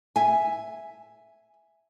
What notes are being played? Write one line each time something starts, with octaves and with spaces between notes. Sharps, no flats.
E5 G#5